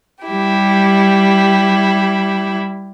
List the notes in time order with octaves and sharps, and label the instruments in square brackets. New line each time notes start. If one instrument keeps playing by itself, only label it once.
[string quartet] G3 E4 G4